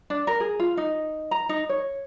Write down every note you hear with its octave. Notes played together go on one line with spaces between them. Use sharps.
D4
A#4
G#4
F4
D#4
A#5
D#4
C#5